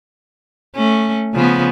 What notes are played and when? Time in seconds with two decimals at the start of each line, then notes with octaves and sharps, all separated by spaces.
0.76 A3 C#4
1.34 C#3 F3 B3